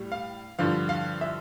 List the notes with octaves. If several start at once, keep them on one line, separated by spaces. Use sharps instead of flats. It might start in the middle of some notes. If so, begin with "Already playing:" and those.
Already playing: A2 G3
F5
G2 D3 F3 F5
F5
E5